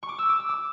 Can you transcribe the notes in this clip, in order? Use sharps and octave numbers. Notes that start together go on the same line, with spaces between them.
C#6
D6
E6
D6
E6
D6